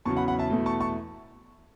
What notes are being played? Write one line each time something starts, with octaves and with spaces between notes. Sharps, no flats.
E2 C#3 F#3 A5 C#6
F#5 B5
F#5 B5
E5 A5
E2 B2 A3
A5 C#6
A5 C#6